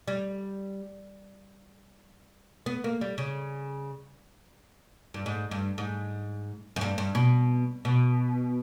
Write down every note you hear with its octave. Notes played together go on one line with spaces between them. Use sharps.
G3
B3
A#3
G3
C#3
G2
G#2
G2
G#2
F#2
G2
G2
B2
B2